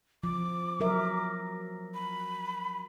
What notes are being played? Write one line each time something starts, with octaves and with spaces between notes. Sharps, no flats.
F3 D6
F#3 A#4 E5
B5